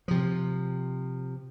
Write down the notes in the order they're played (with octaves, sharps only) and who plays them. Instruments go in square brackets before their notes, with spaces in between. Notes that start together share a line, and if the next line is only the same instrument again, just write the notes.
[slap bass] C3 F3